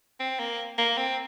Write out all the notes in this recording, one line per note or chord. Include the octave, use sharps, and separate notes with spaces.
C4
A#3
A#3
C4